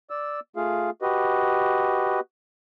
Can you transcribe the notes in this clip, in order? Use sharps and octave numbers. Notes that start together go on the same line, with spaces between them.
D5 E6
A3 F4 G#4 F5
F#4 G4 B4 D#5